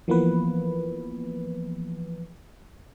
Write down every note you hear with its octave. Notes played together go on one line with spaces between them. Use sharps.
E3 F3 A#3 B3 B4